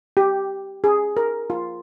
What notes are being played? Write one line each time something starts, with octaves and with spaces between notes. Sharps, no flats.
G4
G#4
A#4
F4